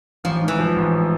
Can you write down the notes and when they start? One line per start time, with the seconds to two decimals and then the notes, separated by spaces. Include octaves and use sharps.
0.24 A1 F3
0.41 G#2
0.48 E3
0.59 F3
0.76 A1